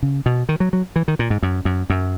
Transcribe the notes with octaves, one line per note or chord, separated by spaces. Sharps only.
C#3
B2
D#3
F#3
F#3
E3
D#3
A#2
G#2
F#2
F#2
F#2